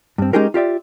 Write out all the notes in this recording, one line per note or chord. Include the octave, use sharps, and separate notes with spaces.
G2 C4
G#3 C#4 D#4 G4 G#4 A#4
F4 G4 D5 E5